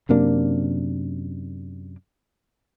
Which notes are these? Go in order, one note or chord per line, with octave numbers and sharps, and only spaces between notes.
F#2 C3 A#3 D4